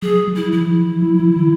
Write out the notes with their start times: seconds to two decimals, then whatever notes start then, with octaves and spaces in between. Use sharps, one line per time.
0.02 F#3 G#4
0.28 F#3
0.36 E4
0.52 F3 E4
0.61 E3
0.68 F3
1.02 F#3
1.20 F3
1.36 D#3